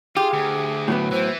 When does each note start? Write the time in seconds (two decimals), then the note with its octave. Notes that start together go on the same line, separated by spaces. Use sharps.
0.16 F4 G4 G#4
0.34 D2
0.88 A2 F#3 B3
1.12 E3 C5